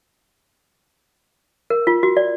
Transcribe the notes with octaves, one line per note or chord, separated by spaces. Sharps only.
A#4
F4
F#4
D5